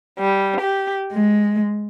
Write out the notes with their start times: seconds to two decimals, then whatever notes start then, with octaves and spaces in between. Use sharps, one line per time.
0.18 G3
0.60 G4
1.12 G#3